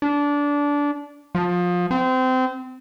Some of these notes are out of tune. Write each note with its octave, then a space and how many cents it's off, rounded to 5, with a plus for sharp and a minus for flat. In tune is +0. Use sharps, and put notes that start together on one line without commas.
D4 -20
F3 +25
C4 -25